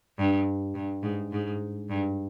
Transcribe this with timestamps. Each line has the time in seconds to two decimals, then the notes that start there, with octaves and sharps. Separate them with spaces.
0.18 G2
0.75 G2
1.03 G#2
1.32 G#2
1.89 G2